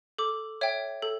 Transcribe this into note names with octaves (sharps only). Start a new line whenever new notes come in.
A4 D6
C#5 E5 G5
A4